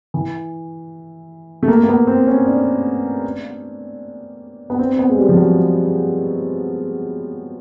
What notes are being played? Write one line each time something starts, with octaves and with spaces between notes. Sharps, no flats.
E3
A3
A#3
A#3
B3
C4
C#4
D4
B3
C4
C4
B3
G#3
G3
F3
F#3